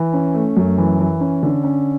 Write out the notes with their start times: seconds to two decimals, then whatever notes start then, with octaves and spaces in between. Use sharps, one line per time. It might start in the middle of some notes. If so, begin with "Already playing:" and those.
Already playing: E3
0.13 C#4
0.34 A3
0.57 F#2
0.78 E3
1.00 E3
1.20 C#4
1.43 D3
1.64 C#4